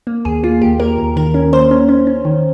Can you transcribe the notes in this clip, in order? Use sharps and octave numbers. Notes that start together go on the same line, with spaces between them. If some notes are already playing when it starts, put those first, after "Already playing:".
A#3
D#2 G#4
A#3 F4
D#2 G4
A#3 A#4
D#2
D#3 A#4
C#4
A#3 C5
C#4
C#4
C#4
D#3